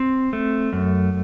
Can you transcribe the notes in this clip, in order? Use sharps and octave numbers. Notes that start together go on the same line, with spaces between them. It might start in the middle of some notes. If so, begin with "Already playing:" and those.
Already playing: C4
A3
F#2